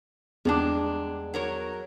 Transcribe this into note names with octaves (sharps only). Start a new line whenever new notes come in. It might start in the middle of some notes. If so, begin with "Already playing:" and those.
E2 G2 G#3 D4
F#3 A#4 C#5